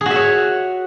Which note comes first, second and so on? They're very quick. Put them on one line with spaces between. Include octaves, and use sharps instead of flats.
G#4 F#4 E5 C#5